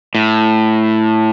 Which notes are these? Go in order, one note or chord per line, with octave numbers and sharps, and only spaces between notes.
A2